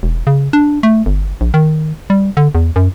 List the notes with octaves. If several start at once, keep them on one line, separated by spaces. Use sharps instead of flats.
E1
C#3
D4
A3
G1
A#1
D#3
G3
D3
E2
F#2